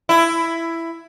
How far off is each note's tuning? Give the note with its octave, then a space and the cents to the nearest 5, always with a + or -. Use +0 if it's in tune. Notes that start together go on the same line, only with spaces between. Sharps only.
E4 +10